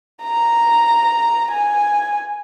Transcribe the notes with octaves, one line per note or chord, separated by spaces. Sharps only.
A#5
G#5